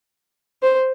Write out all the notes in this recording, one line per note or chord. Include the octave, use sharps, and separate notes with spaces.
C5